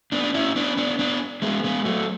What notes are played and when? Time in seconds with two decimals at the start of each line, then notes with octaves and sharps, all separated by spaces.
0.12 B3 D4
0.24 D4
0.34 C#4 E4
0.56 B3 D4
0.77 B3 D4
0.99 B3 D4
1.42 G#3 B3
1.64 G#3 B3
1.85 F#3 A3